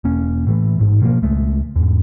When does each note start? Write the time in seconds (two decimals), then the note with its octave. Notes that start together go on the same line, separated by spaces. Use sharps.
0.04 E1 A#3 C#4
0.47 A2 E3 A3
0.78 A1 G#2
1.02 B2 F3 G3 A#3
1.22 C#2 G#3 A3
1.76 E2 G#2